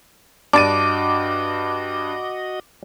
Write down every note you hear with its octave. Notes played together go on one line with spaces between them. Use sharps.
G2 D4 F#4 D#5 A5 D6 D#7